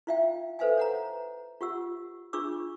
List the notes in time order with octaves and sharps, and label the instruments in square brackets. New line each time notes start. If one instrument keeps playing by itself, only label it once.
[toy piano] E4 F4 E5 F5 G5
A4 B4 C5 E5 F5 G#5
C#5 F#5 A#5
F4 G4 F#5 E6
D4 F4 G#4 C#6 D6 E6